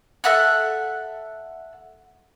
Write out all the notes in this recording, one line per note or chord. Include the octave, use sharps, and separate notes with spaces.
A4 E5 F#5 F#6